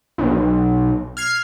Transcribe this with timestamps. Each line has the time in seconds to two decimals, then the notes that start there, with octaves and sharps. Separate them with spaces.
0.18 B1
1.17 F6 G#6 C7